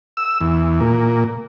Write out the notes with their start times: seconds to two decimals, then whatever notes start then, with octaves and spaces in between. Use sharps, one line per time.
0.17 E6
0.41 E2
0.81 A#2